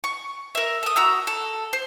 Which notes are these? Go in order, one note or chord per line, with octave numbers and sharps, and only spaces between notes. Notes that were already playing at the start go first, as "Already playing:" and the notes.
C#6
A#4 E5
A4 D#6
F#4 A#5 E6
A4
C5